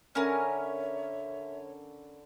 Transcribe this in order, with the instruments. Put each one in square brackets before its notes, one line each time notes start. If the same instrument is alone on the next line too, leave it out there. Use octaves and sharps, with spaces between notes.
[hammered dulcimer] D3 G#5 B5 [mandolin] C#4 A#4 [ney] C#5 [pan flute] E5